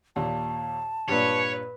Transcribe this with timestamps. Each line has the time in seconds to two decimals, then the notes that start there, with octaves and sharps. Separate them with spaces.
0.16 D#2 A#2 A5
1.09 G2 A#2 B4 C#5